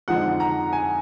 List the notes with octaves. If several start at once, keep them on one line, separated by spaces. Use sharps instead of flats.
F2 D3 F3 G#3 D#4 F#5
A#5
G#5